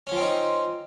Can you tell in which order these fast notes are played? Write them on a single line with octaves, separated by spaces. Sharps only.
C#4 F3 C4 D#4